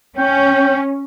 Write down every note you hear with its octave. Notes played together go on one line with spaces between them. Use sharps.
C#4 G5